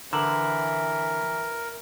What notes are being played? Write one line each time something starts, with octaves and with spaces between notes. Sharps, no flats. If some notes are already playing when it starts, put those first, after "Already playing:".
D3 E3 A#4 A#5 F#7